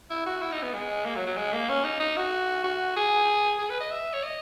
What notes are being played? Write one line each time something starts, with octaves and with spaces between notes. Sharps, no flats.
E4
F#4
E4
D#4
B3
G#3
A#3
F#3
F#3
G#3
A#3
C#4
D#4
D#4
F#4
F#4
G#4
G#4
B4
D#5
E5
C#5
D#5